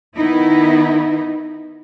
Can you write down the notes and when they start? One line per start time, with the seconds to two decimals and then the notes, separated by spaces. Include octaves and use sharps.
0.16 D#3 B3 D#4 E4